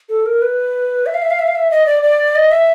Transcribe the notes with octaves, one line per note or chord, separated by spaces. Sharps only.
A4
A#4
B4
E5
F5
E5
F5
E5
F5
E5
D#5
D5
D5
D#5
E5